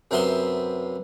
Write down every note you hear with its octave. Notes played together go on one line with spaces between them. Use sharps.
F#2 C3 B3 E5 C6